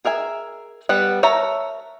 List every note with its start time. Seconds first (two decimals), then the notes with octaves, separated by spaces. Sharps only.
0.05 G#4 A#4 E5 G#5
0.89 G3 B3 B4 F#5
1.23 A#4 C#5 E5 A5 A#5